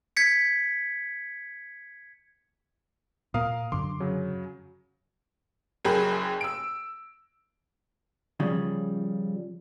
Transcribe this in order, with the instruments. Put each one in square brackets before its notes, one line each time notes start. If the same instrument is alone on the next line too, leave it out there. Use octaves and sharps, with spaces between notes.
[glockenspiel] G#6 B6 C#7
[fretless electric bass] A#2 A#3 [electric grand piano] A#4 F5 D#6
[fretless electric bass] F#2 D3 [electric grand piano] C6 D6
[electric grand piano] C#3 F#3
[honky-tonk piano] F#1 F#2 G#4 A#4 G5 B5
E6 D7
[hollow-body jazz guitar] C#3 F3 G3